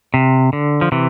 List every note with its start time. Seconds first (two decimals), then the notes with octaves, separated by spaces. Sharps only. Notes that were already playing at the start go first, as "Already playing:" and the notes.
0.14 C3
0.53 D3
0.81 F3
0.92 C3 E3